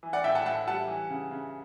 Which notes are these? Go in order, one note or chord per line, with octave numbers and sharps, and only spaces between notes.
E3
D5 F#5
A2 E5 G5
F#5 A5
A2 F#5 A5
G3 F#5 A5
E3
C#3
C#3